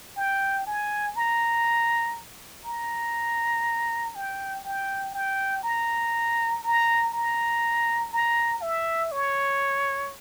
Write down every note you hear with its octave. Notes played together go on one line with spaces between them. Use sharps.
G5
G#5
A#5
A#5
G5
G5
G5
A#5
A#5
A#5
A#5
E5
C#5